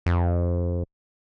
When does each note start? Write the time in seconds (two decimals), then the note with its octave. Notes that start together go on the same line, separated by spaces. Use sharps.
0.06 F2